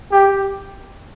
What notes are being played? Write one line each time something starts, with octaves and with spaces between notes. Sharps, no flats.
G4